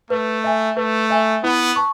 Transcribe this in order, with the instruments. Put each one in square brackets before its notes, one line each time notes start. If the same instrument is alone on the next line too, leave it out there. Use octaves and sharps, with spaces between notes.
[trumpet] A3 [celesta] B4
[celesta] E5 G#5
[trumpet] A3 [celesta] B4
[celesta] E5 G#5
[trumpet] B3 [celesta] E4
[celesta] A5 C#6